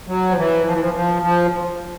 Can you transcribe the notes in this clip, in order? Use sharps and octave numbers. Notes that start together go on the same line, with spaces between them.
F#3
F3
E3
F3
E3
F3
F3
F3